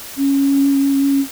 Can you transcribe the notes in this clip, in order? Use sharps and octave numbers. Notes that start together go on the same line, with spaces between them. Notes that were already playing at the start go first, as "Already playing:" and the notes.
C#4